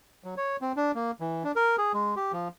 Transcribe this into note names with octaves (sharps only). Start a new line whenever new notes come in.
F#3
C#5
C4
D4
A#3
E3
D4
A#4
G#4
G#3
G4
F3